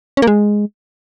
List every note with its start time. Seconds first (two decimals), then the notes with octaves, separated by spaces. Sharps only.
0.17 C#4
0.22 A#3
0.27 G#3